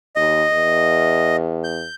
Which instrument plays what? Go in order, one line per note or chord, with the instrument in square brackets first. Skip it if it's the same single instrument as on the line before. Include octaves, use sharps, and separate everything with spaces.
[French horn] D#2 [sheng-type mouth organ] D#5
[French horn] E2
[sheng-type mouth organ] G6